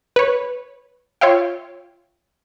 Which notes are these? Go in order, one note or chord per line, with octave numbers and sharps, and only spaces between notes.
B4 C#5
F4 C#5 E5 F5 G5